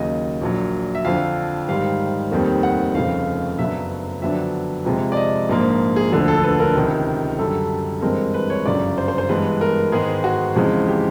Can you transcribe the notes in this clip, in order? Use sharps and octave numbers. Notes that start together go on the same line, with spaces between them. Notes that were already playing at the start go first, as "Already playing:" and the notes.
Already playing: D#2 C#3 F#3 D#5
A#1 A#2 F#3
E5
F2 D3 F3 F5
G#2 D#3 G3 F5
F1 D#2 D#3 G3 C4
F#5
F1 F2 C#3 F5
F#2 C#3 F#3 B3 D4 E5
F2 D3 F#3 B3 D4 E5
F2 C3 F3 G#3
D5
D#5
A#1 G#2 F3 A#3
G#4
E1 D2 D3 F3 A3 G#4
A4
B4
A#4
C#2 C3 D#3
F#2 D3 G3 A4
G2 E3 G#3 C4 A#4
B4
C#5
G1 F#2 C#3 D5
C5
C5
C5
G2 E3 G#3 B3 B4
A#4
G#2 D#3 G#3 B3 G#4
F#4
E2 C#3 F3 G#3 C4
G4